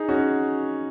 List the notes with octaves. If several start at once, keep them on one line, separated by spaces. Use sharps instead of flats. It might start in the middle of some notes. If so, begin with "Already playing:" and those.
Already playing: D#4 G#4
C#4 F#4